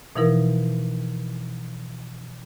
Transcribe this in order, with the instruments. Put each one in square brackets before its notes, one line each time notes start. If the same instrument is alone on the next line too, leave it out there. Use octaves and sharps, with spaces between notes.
[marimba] B2 E3 F3 D#4 E4 A#4